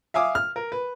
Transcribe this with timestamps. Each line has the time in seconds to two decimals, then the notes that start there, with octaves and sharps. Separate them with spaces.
0.14 E5 F5 G#5 D6 D#6
0.35 F6
0.56 A#4
0.72 B4